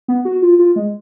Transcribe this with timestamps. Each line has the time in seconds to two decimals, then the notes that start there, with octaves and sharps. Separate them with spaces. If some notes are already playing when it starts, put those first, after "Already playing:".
0.08 B3
0.25 F#4
0.42 F4
0.59 F4
0.76 G#3